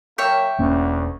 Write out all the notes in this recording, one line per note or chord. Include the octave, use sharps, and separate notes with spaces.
F#3 A#3 C#5 E5 G5
E1 D2 E3 A#3 C#4 F#4